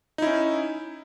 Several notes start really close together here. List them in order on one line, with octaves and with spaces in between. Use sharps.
D#4 E4 C#4